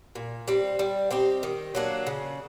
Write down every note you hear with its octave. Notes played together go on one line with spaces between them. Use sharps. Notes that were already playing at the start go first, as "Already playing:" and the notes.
A#2
G3 C4
G3
C4 D#4 G4
D#3
F#3 A#3 D4
C#3